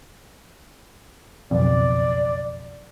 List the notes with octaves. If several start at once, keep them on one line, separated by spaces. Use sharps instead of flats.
F#1 B1 F2 D5